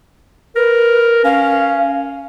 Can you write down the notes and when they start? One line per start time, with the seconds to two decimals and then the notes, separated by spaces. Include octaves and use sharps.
0.56 A#4 B4
1.25 C#4 F5